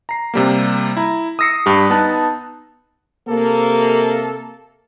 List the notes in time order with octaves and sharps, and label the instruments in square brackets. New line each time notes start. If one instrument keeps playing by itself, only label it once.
[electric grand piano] A#5 C7
C3 G3 A#3
E4 A#5
D#6 E6 A#6 C7 C#7
G2 G4
B3 D#4 A5 F#6
[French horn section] C3 A#3 [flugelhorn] A4